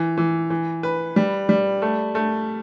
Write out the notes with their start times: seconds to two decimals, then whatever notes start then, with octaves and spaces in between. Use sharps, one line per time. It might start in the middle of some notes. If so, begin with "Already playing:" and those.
Already playing: E3
0.18 E3
0.50 E3
0.83 B4
1.16 G3
1.49 G3
1.82 A3
2.15 A3